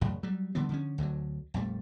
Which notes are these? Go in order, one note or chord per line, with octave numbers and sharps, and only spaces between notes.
A1 F#2 C#3
F#3 G3
D3 E3 G3 B3
D3 F3 C#4
D2 D3 D#3 F#3
A#1 F2 G3 A3